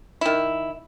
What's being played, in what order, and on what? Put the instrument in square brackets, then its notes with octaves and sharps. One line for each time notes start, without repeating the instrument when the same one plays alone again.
[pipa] D#3 E4